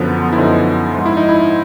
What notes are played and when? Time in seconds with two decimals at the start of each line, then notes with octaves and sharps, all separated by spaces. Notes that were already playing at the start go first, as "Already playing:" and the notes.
Already playing: F#2 D3 F3 B3
0.32 E4
0.38 F#2 D3 F3 D#4
0.94 G#2 F3 F4
1.06 E4
1.17 D#4
1.29 E4